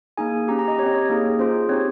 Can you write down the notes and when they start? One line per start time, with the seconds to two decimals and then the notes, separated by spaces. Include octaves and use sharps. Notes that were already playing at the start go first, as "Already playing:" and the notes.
0.17 A#3 D#4 G#4 G#5
0.48 C#4 G4 A#5
0.59 A#5
0.68 D#5
0.78 G4 C#5
0.83 C4 D#5
0.95 C#5
1.10 A#3 D#4 G#4
1.39 C#4 F4 G#4 C5
1.69 C4 D#4 G4 C#5